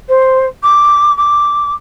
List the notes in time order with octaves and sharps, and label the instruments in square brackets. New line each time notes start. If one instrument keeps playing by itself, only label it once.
[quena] C5
D6
D6